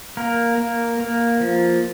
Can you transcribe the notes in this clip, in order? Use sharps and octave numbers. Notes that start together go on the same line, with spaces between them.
A#3 A#4
A#3
A#3
F3